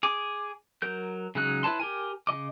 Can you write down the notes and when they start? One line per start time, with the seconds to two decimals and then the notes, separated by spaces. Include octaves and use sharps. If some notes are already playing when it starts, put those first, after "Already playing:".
0.03 G#4 D6
0.82 F#3 A#4 G6
1.35 C#3 F#3 G#3 D#4 F#6
1.63 E4 B4 C#5 A5 C6
1.79 G4 A#4 G#5
2.27 C#3 F3 D#5 D6